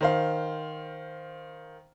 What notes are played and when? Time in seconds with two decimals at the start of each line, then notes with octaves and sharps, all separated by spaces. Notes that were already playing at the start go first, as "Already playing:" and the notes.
0.01 D#3 C5 F5